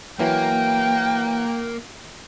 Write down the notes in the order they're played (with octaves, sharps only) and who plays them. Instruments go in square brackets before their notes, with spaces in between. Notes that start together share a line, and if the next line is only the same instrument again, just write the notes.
[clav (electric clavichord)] E3 F#3 [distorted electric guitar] A#3 [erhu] G5